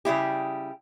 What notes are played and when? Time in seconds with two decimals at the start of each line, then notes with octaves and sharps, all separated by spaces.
0.05 C#3 G3 E4 G4